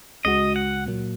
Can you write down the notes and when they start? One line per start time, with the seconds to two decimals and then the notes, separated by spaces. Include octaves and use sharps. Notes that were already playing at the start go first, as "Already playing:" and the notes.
0.25 C#2 C#3 G#3 F#4 D#5
0.56 F#5
0.86 A#2 F#3 A#3